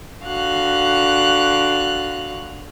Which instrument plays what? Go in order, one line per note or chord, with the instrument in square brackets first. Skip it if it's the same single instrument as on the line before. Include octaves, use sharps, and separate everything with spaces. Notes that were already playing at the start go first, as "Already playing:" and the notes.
[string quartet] D3 F#4 F5 F#6